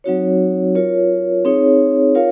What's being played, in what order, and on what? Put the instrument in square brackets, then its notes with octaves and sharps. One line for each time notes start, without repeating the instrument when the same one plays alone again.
[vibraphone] F#3 C4 D#4 F#4 C#5
F4 A#4 C#5
C4 D#4 G#4 C#5
F4 A#4 C#5 F5